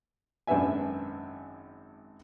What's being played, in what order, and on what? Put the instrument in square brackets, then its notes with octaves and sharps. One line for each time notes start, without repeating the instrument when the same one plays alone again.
[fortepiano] G#1 F#2 D4 B4 E5 G#5